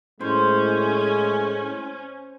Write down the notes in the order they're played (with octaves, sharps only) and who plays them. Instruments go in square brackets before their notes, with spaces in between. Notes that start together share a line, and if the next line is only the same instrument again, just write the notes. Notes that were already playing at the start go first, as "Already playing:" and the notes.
[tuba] A2 [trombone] G#3 [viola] C#4 [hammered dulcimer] C5